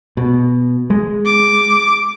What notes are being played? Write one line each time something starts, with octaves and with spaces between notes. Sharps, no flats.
B2
G#3
D6